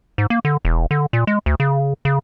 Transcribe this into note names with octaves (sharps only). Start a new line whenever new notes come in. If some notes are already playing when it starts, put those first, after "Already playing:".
G#2
A#3
D3
E1
D3
A#2
G#3
D2
C#3
C#3